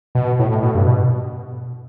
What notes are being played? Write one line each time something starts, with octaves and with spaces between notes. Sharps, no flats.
B2
A2
A2
B2
G2
B2